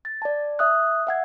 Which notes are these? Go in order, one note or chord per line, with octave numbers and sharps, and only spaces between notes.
A6
D5 A5
E5 D#6 F#6
E5 F#5 G#6